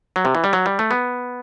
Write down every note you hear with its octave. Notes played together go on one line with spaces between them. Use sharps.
F#3
C3
E3
G3
F#3
G3
A3
B3